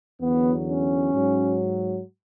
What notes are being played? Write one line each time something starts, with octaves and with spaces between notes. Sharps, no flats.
E2 D3 F#3 B3
C#4
G#2 F#3